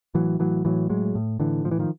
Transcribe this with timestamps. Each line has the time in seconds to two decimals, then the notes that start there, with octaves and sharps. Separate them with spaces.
0.15 A2 E3 F#3
0.39 A2 E3 F#3
0.65 A2 E3 F#3
0.89 A2 F#3 G#3
1.15 A2
1.40 A2 D3 E3
1.64 A2 F3
1.71 E3
1.79 D#3 F3